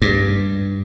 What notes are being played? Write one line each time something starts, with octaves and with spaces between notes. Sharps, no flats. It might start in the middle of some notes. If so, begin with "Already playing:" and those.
G2